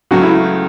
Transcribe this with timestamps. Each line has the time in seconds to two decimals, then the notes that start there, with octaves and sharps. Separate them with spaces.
0.11 C#2 C#3 F#3 A3 F#4
0.23 E4